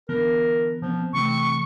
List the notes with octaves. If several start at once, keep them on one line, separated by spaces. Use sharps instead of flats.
D3 E3 B3 A#4
B2 F3 B3 C4
C3 E3 A3 C4 C#6